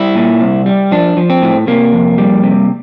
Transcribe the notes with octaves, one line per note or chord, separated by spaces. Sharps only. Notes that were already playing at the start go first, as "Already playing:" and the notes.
Already playing: G3 E4
A#2
C2
G3
F3 D4
F3
C4
A2
C3 A#3
F2
G3
C3